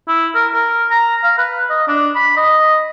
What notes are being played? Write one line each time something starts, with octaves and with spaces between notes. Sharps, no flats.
E4
A#4
A#4
A#5
F5
B4
D#5
D4
B5
D#5